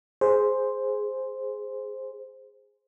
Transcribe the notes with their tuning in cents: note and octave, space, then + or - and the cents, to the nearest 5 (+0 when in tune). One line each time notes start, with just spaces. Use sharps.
G#4 +0 C5 +0